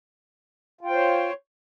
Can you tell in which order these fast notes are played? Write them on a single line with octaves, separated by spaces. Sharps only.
F4 G5 C5 C#5